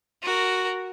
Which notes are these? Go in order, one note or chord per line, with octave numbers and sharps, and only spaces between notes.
F#4 A#4